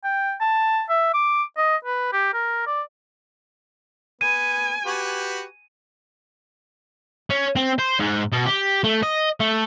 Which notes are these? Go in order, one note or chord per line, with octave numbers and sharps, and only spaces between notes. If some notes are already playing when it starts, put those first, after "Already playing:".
G5
A5
E5
D6
D#5
B4
G4
A#4
D5
B3 G#5 D#7
F#4 G4 B4
C#4
C4
C5
G#2
B2
G4
A3
D#5
A3